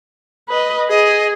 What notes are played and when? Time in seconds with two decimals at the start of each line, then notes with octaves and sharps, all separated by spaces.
0.49 B4 D#5
0.90 G#4 D#5